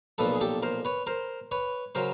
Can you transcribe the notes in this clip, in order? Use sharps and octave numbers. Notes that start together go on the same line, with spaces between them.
B1 A#2 F3 A4 B4
G#4
G4 A4
A#4 C5
B4 C#5
A#4 C5
B4 C#5
C#3 F#3 A#4 C5